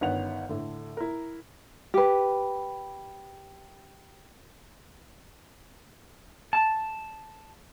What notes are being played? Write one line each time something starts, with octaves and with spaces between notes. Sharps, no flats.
G1 D#3 B3 C#4 F#5 F7
A2 D3
E4 A#4
G4 B4
A5